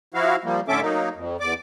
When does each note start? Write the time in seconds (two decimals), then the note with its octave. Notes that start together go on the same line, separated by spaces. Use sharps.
0.14 F3 E4 F#4 F5
0.44 F3 G3 A#3
0.68 A2 D3 C#4 A4 E5 D6
0.81 F#3 A#3 D#4
1.16 F2
1.40 E2 D5 D6